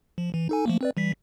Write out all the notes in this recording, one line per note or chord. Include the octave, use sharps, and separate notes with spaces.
F3
E3
D#4 A4 G#5
F3 A3 A#3
C4 B4 D5
E3 G3 B6